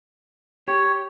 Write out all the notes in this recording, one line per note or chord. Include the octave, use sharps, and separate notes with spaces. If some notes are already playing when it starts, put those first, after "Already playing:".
G4 C#5